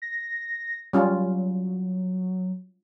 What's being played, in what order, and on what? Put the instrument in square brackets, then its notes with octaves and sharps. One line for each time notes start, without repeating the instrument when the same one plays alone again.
[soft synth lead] A#6
[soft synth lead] F#3 [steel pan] G3 C#4 F4